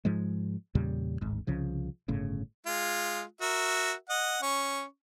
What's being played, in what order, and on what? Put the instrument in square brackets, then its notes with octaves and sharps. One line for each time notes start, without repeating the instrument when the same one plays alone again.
[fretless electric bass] G#2 F3 G#3
E2 A#2 C#3 G3
D1 G#1 G#2
C2 C#3 F3
G1 A2 C#3
[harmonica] G#3 F4
F#4 A#4 E5
D#5 F#5
C#4 C#6